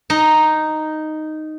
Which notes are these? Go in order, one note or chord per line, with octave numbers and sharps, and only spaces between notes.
D#4